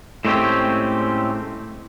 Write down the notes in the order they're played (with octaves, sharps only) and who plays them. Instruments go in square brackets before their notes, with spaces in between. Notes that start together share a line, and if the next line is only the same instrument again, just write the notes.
[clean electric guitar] A2 G#3 A3 C4 C#4 G4